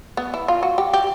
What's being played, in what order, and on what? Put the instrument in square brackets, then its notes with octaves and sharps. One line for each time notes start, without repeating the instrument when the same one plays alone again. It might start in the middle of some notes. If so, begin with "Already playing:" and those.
[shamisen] B3
E4
F4
F#4
G4
G4